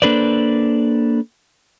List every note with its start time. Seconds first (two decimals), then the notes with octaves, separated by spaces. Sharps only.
0.02 A#3 D4 A4 B4 C5 D5